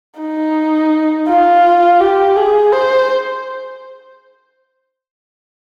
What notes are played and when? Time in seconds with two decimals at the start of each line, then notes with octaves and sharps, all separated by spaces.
0.20 D#4
1.28 F4
2.00 G4
2.36 G#4
2.72 C5